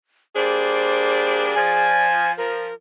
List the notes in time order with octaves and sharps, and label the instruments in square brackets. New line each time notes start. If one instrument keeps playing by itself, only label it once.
[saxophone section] G3 A#3 D4 [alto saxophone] G#4 [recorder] C5
[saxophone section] F3 [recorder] D5 [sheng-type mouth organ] G#5
[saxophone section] F3 [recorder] A#4